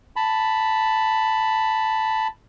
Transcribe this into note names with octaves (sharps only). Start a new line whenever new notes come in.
A5 B5